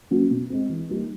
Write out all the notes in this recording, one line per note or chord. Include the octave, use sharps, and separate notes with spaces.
F#3 A#3 C#4
B2
G#3 C4
E3
G3 A#3 D#4